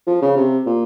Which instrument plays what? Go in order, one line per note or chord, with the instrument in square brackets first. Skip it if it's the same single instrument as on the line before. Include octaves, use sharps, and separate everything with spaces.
[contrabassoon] F3
C#3
C3
A#2